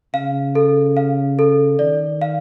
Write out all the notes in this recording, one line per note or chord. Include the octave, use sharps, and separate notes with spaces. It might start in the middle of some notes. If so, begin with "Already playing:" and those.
C#3 F5
A4
F5
A4
D#3 D5
F5